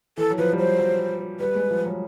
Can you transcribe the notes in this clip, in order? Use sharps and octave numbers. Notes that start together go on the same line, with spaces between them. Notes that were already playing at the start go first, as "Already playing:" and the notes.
E3 A4
F#3
F3 B4
G3
F#3 C5
F#3
G3 B4
G#3
F3
F#3